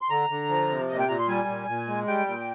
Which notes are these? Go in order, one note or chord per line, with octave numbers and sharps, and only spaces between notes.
C6
D3 A#5
D3
F3
C3
A#2 D#5
G5
A#2 A#5
C6
G3 G#5
A#2
A#2
G#3
G3 G5
A#2